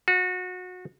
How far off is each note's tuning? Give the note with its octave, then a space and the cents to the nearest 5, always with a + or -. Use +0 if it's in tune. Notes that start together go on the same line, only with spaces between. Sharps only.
F#4 -25